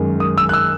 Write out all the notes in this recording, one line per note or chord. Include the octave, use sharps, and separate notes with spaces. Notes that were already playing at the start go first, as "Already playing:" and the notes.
Already playing: F#2 D#3 G#3
D#6
E6
F#6
E6